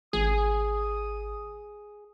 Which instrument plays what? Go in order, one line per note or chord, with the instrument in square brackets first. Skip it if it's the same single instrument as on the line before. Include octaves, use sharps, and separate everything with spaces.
[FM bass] G#1 [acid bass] G#4 [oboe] D#6